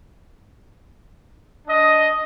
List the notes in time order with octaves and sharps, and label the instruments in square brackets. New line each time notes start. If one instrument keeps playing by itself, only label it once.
[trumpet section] D4 D#5